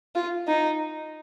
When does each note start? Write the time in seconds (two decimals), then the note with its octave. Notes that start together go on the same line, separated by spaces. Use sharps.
0.15 F4
0.48 D#4